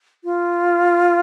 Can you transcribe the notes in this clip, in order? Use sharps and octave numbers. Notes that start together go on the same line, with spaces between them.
F4